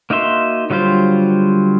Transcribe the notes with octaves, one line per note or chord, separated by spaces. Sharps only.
A#3 D#4 F#4 E5 C6
D3 F#3 G3 F4 C5